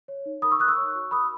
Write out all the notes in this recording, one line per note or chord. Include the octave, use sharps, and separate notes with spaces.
C#5
D#4
A#4 B5 D#6
C#6 E6
D#4 D#6 F#6
C#6 E6
C#5
F#4
A#4 B5 D#6